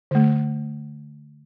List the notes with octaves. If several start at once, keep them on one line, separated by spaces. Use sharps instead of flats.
D3 A3